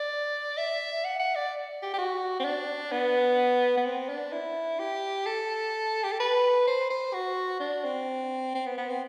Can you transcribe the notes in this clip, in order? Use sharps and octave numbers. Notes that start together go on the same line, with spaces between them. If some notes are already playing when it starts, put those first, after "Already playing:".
Already playing: D5
E5
F#5
F#5
D5
G4
G4
F#4
C4
D4
B3
B3
C4
D4
E4
G4
A4
G4
A4
B4
C5
C5
F#4
D4
C4
C4
B3
B3
C4